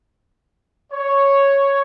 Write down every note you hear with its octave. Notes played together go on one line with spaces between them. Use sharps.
C#5